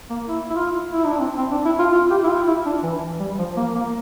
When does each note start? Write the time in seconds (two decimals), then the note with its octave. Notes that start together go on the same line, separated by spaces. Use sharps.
0.10 A#3
0.28 E4
0.50 E4
0.56 F4
0.91 E4
1.05 D4
1.19 C4
1.38 C4
1.51 D4
1.65 E4
1.79 F4
1.92 F4
2.10 G4
2.24 E4
2.29 F4
2.47 E4
2.65 D4
2.83 E3
3.20 G3
3.38 F3
3.57 A#3
3.75 A#3